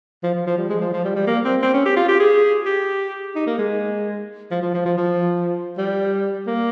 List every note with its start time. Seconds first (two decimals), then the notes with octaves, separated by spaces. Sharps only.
0.23 F3
0.35 F3
0.47 F3
0.57 G3
0.69 G#3
0.81 F3
0.93 F3
1.05 G3
1.16 G3
1.27 A#3
1.45 C4
1.62 C4
1.74 C#4
1.86 G4
1.97 F4
2.08 G4
2.20 G#4
2.66 G4
3.35 D#4
3.47 A#3
3.58 G#3
4.51 F3
4.62 F3
4.74 F3
4.86 F3
4.97 F3
5.78 G3
6.47 A#3